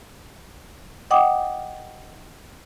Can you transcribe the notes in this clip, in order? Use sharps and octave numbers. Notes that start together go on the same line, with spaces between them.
D#5 F#5 G5 D6 D#6